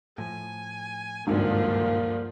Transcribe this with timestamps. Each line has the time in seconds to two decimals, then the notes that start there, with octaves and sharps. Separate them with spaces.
0.18 A2 F3 G#5
1.27 D#1 G#1 C#2 G2 D3 F3 A#3